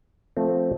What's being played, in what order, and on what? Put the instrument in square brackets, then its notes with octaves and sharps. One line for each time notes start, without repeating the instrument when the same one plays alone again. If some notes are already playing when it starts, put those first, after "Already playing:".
[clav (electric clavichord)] F3 A3 C4